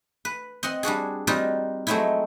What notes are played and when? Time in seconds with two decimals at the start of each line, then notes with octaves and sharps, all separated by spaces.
0.25 B4
0.63 C4 D#5 F#5 C6
0.83 G3 D4 F#4 G#4
1.27 G3 C4 D#4 F4 F#4 A#4
1.87 F#3 G#3 A3 C4 D#4 E4